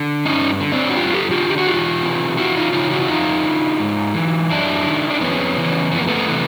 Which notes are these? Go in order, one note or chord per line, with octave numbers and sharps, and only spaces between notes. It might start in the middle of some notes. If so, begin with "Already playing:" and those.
Already playing: D3
G2 C#4 D#4
D3
C4 D4
F#4
F#2 F4 G4
G4 A4
D3 F4 G4
G4
F#4
E2 F4 G4
C3 E3
E2 E4 F#4
D#4 F4
C#3 E3 D#4 F4
E4 F#4
E4
F2 D#4 F4
D3
G#2
E3
F#2 D4 E4
D#3
D4
F2 B3 C#4
C#3 E3
F2 B3
A#3
A3 B3
C3 E3